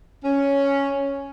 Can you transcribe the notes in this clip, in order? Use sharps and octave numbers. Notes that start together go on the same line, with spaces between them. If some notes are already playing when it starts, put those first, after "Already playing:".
C#4